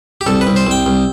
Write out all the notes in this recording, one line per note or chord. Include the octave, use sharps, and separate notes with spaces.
G4
C2 A4
B4
C2
C5
C2 G5
C2